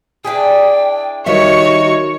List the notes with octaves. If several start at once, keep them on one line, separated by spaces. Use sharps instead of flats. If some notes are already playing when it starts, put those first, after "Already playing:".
D4 E4 G#4 G5
D#3 G3 F#4 C#5 E5 C#6